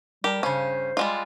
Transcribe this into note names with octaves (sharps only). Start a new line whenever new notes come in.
G3 G4 A#4 A5
G2 C#3 C#4 C5
G3 G#3 F4